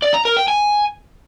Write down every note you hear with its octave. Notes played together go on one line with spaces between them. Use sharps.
D5
A#5
A#4
G5
G#5